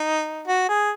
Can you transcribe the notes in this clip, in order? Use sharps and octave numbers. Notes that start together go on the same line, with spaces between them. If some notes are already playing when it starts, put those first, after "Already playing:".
Already playing: D#4
F#4
G#4